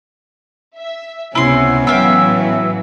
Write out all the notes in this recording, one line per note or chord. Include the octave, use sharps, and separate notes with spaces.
E5
C#2 C3 B3 C#4 E4 C6
A2 E3 F#3 E5 F5 G5